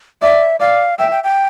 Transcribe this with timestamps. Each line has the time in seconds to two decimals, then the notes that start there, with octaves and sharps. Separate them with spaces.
0.22 D5 E5
0.60 D5 F5
0.99 E5 G5
1.11 G5
1.24 G5